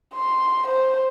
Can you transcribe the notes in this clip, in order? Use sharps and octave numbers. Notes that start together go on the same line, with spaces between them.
C6
C5